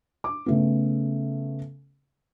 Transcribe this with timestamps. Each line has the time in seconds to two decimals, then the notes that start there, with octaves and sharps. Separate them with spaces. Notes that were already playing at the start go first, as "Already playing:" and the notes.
0.24 D6
0.46 C#3 A3 B3